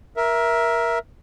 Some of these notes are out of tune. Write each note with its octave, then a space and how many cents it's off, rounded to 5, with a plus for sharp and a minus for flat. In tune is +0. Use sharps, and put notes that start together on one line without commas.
A#4 +15 E5 +0